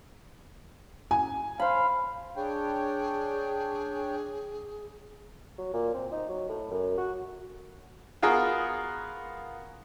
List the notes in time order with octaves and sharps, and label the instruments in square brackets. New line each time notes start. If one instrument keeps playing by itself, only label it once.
[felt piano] G#5
[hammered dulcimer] C5 B5 [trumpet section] F5
[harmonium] D4 C#5 G5 [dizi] G#4
[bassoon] F#3
A#2
C4
D#4
F#3
A2
F#2
F#4
[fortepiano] B3 F4 F#4 G#4 A#4